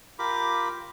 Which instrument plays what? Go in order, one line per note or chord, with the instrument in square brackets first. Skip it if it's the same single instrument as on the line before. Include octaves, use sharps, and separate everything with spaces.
[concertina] F4 G4 A#4 B5 D6